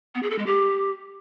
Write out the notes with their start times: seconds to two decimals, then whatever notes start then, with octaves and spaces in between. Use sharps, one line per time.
0.15 B3
0.23 G#4
0.31 A4
0.38 G#3
0.46 G4